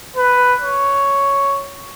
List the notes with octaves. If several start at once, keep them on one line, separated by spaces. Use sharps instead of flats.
B4
C#5